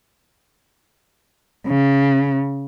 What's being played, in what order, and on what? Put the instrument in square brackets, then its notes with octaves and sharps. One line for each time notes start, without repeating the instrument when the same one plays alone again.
[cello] C#3